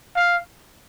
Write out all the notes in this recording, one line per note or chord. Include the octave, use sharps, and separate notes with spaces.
F5